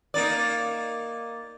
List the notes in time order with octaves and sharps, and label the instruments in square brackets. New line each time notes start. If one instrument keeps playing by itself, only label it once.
[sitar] A#3 D#4 D5